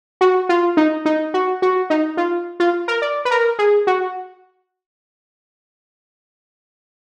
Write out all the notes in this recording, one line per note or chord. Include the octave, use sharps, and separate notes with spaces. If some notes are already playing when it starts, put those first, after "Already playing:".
F#4
F4
D#4
D#4
F#4
F#4
D#4
F4
F4
A#4
D5
B4
A#4
G#4
F#4